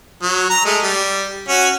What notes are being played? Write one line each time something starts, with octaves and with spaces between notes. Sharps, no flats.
F#3
A#5
G#3 A3
G3
C#4 F#4